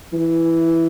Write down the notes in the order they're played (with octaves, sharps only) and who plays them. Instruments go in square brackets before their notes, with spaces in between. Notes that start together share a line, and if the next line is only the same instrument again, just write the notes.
[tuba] E3